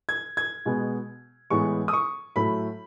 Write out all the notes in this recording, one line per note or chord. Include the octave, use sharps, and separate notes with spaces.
G#6
G#6
B2 G#3 B3
A2 E3 G#3 B3 C#6
D#6
C#6
A2 F#3 A3 B5